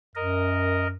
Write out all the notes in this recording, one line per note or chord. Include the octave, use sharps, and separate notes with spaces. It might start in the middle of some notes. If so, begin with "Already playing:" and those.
F#2 A#4 D#5